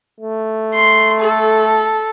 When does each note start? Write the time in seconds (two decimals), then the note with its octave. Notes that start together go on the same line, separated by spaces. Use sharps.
0.20 A3
0.75 C6
1.21 A4